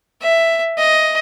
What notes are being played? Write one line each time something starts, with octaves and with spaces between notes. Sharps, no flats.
E5
D#5